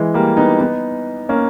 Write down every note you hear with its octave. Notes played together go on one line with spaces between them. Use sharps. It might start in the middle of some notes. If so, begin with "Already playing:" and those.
Already playing: E3 G#3
G3 A#3
B3 D#4
B3 D#4
A#3 C#4